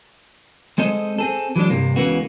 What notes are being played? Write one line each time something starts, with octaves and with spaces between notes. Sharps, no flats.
G#3 C4 A4 D#5
C4 G#4 A4
E3 F#3 G#3 D4
G2 C3 A#3
C#2 C#3 E3 A#3 B3 F#4